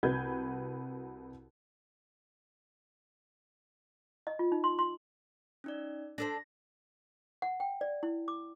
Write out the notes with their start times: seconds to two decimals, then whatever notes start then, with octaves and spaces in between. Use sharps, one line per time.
0.03 C2 F#4 B4 G6 G#6
4.27 D#5
4.39 F4
4.52 D#4
4.64 C6
4.79 C6
5.64 C#4 D#4 D5
6.18 D4 A4 C5 A#6
7.42 F#5
7.60 G5
7.81 D5
8.03 E4
8.28 D6